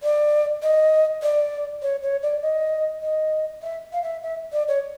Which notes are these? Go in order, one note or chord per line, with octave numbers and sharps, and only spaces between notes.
D5
D#5
D5
C#5
C#5
D5
D#5
D#5
E5
F5
E5
E5
D5
C#5